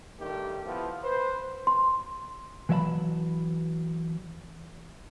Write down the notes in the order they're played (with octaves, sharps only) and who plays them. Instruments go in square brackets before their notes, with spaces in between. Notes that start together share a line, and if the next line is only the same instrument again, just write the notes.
[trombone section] G2 D#3 A3 G4
F3 B3 E4
B4 C5
[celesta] C6
[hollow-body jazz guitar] E3 F#3 A#4 E5 A5 B5